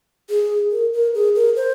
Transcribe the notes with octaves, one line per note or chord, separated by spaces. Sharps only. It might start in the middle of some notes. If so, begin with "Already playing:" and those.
G#4
A#4
A#4
G#4
A#4
C5